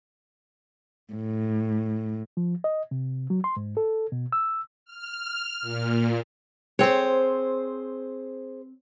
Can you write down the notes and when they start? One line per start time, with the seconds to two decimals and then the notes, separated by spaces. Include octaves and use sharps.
1.13 A2
2.37 F3
2.64 D#5
2.91 C3
3.30 F#3
3.44 C6
3.57 G#2
3.77 A4
4.12 B2
4.32 E6
4.85 F6
5.61 A#2
6.79 C4 G#4 C5 C#5